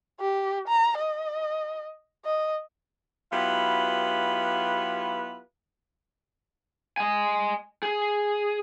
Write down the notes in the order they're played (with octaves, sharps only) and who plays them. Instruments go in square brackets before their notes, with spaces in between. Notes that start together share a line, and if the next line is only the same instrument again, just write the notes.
[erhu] G4
A#5
D#5
D#5
[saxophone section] F#3 B3 E4 F4 G4 B4
[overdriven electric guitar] D#5 G#5
G#4